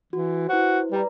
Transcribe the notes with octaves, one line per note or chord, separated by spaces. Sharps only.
E3 F#4
E4 F#4 B4 C5
G3 B4 D5 A#5